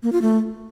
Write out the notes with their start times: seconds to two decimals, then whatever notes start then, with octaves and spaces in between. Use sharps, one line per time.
0.03 A#3
0.12 F4
0.22 A3